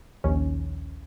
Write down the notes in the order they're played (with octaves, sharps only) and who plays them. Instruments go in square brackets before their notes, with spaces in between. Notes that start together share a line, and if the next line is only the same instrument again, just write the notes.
[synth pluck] A#1 D#2 C#4